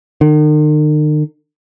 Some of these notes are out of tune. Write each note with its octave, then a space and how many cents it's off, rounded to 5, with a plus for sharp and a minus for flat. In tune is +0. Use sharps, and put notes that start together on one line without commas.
D#3 -45